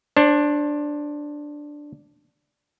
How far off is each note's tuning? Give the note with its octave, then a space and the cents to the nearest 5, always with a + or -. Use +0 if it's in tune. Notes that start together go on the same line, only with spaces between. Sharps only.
D4 +0 C5 +35